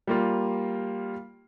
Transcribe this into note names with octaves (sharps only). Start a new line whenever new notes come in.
G3 A#3 F4